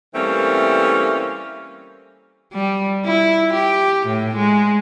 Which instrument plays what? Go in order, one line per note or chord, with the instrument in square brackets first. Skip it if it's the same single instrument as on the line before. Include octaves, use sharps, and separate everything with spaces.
[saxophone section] E3 G3 A3 A#3 C4 C#4
[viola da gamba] G3
E4
G4
A2
G#3